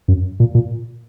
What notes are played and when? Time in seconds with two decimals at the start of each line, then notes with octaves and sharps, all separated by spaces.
0.08 F#2
0.40 A#2
0.55 A#2